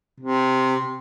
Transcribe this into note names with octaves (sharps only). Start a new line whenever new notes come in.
C3